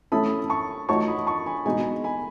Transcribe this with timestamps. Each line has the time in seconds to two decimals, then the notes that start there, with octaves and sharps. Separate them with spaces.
0.12 A3 C#4 E4 A4 B5 D#6
0.50 A5 C#6
0.89 A3 D#4 F#4 C#5 A5 C#6
1.07 B5 D#6
1.26 A5 C#6
1.46 G#5 B5
1.65 B2 G#3 D#4 G#5 B5
2.04 G#5 B5